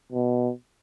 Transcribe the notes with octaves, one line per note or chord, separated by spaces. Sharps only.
B2